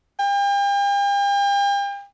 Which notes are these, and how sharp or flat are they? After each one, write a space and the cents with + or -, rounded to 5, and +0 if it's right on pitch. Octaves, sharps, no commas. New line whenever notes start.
G5 +40